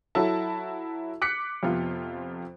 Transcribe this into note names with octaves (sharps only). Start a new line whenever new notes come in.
F#3 E4 F#4 A4 E5 A5
D6 F#6 B6 C#7
F2 C3 F3 B3 F4